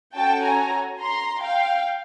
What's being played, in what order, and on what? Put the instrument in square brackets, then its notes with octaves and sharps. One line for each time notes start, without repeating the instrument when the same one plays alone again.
[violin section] C#4 F#4 A4 G5 A5
G#5 A#5
A#5 C6
F5 G5